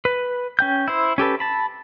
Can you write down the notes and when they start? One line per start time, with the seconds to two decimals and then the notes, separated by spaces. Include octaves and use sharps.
0.05 B4
0.59 C#4 G5 G6
0.88 E4 C5
1.18 C#4 G4 A4 B4
1.40 A5 B5